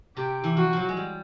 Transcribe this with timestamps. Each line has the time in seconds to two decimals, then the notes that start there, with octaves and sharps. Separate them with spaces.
0.17 C3 G4
0.44 E3
0.57 F3 F#4
0.73 F3 F#3
0.89 G#3
0.97 G3